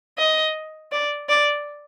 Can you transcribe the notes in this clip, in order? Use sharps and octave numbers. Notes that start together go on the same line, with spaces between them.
D#5
D5
D5